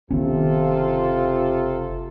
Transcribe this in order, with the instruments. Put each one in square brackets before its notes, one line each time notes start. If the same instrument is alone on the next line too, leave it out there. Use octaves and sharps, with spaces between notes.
[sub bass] F#1 [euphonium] C3 [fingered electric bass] D#3 B3 C#4 [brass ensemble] F4 A4